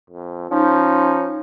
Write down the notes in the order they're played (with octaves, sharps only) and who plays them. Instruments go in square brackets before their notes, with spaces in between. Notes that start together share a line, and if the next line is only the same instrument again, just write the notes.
[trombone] F2
[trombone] F3 [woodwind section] C#4 D#4